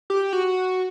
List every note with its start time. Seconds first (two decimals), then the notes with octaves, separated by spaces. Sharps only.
0.10 G4
0.33 F#4